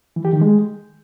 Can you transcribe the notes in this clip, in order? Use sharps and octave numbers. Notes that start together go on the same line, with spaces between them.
E3
G4
D#3
G#3